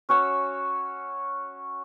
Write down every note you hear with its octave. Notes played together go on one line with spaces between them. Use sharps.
C#4 F#4 C#5 E6